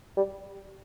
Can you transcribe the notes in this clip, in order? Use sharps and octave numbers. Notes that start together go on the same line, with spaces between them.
G3